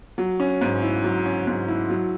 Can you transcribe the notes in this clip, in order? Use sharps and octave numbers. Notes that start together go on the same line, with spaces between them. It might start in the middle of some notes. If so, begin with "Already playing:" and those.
F#3
C#4
G#2
E4
F#3
C#4
G#2
E4
F#3